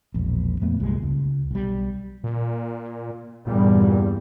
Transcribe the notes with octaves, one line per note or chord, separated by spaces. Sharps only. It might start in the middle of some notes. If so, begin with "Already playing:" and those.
E1 A#1
F2 A#2 A3 B3
C2 G2 A#2 G#3
C#2
B1 G3
A#2
E2 G2 A#2 G3